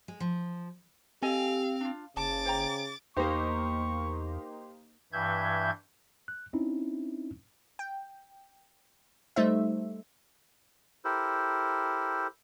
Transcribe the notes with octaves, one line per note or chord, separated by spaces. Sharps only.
G#3
F3
C4 G4 A4 D#5 F5 G#5
D4 F4
F#1 C#3 A5 D6 A6
C5 G5 A#5
E2 A#3 D#4 G4 C5 C#6
G2 E3 E5 G6 G#6
F#6
C4 C#4 D#4 E4
G5
G3 A3 D#4 C5 E5
E4 G4 A4 A#4 C5